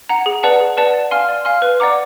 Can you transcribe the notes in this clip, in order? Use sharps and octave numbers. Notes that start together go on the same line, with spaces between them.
F#5 A#5
G#4
B4 D5 F#5 A5
G#4
B4 D5 F#5 A5
D5
F5 G#5 C6 F6
D5
F5 G#5 C6 F6
B4
D5 F#5 A#5 D6